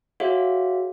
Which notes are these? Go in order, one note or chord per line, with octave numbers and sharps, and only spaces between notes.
F#4 G#4 C#5 E5 F5